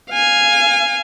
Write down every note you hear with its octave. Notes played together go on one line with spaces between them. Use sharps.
F5 G#5